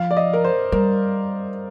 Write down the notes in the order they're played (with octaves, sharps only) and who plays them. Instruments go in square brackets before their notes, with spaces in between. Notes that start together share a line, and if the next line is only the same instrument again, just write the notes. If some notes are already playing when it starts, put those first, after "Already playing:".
Already playing: [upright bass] F3 [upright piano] F5
[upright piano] D5
D#5
A#4
C5
[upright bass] G3 [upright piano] A#4